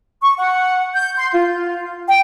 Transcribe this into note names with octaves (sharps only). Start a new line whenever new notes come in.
C#6
F#5
G6
C6
F4
G5